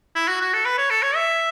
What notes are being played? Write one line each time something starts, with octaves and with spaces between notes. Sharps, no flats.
E4
F#4
F#4
A4
B4
C#5
A4
C#5
E5